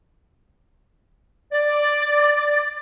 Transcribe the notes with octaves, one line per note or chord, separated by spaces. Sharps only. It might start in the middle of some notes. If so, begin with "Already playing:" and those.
D5